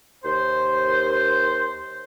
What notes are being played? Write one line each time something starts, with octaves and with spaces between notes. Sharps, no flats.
D#2 C5